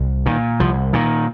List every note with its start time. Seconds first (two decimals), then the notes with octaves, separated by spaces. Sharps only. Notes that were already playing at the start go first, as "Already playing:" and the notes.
Already playing: C2
0.26 A#2 D#3
0.60 C2 F3
0.93 A#2 D#3